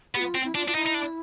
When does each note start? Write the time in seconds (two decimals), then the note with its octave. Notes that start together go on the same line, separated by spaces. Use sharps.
0.15 B3 G4
0.20 F4
0.35 C4
0.45 E4
0.55 D4 F4
0.68 D4 F4
0.74 D#4 E4
0.87 D#4
0.95 D4